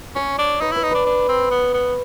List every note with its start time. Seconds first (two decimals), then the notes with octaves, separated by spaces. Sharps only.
0.16 C#4 C#5
0.39 D4
0.61 D#4 B4
0.72 E4 B4
0.83 D#4
0.91 D4 B4
1.06 D4
1.29 C4
1.51 B3
1.74 B3